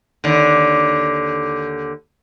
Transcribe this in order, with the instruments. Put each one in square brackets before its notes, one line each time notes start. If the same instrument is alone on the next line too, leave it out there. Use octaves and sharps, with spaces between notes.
[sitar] D#2 D3